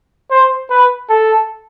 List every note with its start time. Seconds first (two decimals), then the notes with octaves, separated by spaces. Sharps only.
0.31 C5
0.70 B4
1.09 A4